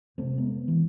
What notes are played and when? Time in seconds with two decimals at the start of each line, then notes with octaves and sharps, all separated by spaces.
0.17 F2 C3 A3 C4
0.38 G#3 B3
0.68 E3